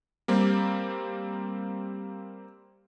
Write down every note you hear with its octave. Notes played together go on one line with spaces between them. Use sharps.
G3 A#3 C4